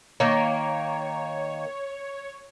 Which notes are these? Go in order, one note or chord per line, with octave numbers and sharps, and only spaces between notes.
D#3 A#3 C#5